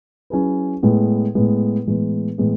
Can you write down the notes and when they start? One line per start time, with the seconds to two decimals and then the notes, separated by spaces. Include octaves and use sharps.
0.30 F#3 C#4 E4 G#4 B4
0.83 A2 G#3 B3
1.35 A2 G#3 B3
1.87 A2 E3 G#3 B3
2.38 A2 E3 G#3 B3